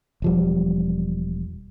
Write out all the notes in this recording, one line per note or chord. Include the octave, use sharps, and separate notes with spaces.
E1 F3 G3